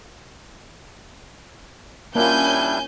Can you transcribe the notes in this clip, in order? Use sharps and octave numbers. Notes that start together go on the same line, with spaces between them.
G3 A#3 C#4 D4 E4 F4 G#5 G6